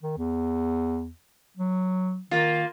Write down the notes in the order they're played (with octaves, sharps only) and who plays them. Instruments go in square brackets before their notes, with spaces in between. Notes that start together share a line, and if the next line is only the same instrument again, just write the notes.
[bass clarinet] D#3
E2
F#3
[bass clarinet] D#3 [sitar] A#3 F4